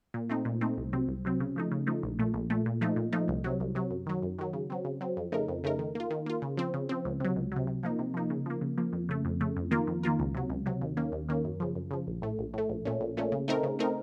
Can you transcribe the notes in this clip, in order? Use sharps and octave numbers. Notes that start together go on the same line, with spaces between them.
A#2
A3 C4 D#4
A#2
A3 C4 D#4
C2
C3 F#3 C4
C2
C3 F#3 C4
C#3
F3 A3 D#4
C#3
F3 A3 D#4
A#1
A#2 A3
A#1
A#2 A3
A#2
F3 A3 D#4
A#2
F3 A3 D#4
C2
C3 F#3
C2
C3 F#3
F#2
D#3 F#3
F#2
D#3 F#3
C#3
F#3 C4
C#3
F#3 C4
F2
C#3 A3 D#4 A#4
F2
C#3 A3 D#4 A#4
D#3
A#3 F4
D#3
A#3 F4
C#3
F3 C4
C#3
F3 C4
C#2
C3 F#3
C#2
C3 F#3
C3
F3 A#3 D#4
C3
F3 A#3 D#4
C#3
F3 A#3
C#3
F3 A#3
F2
C#3 A3
F2
C#3 A3
F2
D#3 A#3 F4 A#4
F2
D#3 A#3 F4 A#4
C#2
C3 F#3
C#2
C3 F#3
D#2
D#3 A#3 C#4
D#2
D#3 A#3 C#4
F#2
C#3 F3
F#2
C#3 F3
A#1
A2 A3
A#1
A2 A3
A#1
A#2 A3 C#4
A#1
A#2 A3 C#4
C#3
A3 C4 D#4 A#4
C#3
A3 C4 D#4 A#4